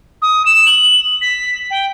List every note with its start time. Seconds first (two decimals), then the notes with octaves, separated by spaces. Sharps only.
0.22 D#6
0.46 E7
0.66 F#7
1.22 B6
1.70 G5